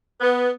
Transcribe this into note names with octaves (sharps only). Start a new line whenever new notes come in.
B3